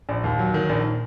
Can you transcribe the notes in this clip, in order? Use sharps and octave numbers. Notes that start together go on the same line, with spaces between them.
A#1
D#2
F#3
D#3
A#1